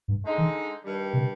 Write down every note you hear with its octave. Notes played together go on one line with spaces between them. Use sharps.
G2
D3 G#3 D#4
D#3
G2 D#3 G3
C3